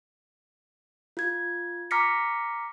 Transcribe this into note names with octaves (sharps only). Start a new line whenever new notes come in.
F4 G#6
A#5 D6 F6 A#6 B6 C#7